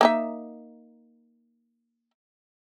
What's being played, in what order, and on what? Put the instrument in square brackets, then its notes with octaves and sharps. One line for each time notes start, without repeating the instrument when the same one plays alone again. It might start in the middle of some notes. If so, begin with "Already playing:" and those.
[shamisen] A#3 D#4 E5